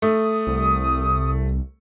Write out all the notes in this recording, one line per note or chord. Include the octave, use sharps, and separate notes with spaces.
A3 D#6
C2